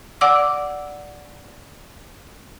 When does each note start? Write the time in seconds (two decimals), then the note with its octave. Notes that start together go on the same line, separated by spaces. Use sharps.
0.21 D5 F#5 D6 E6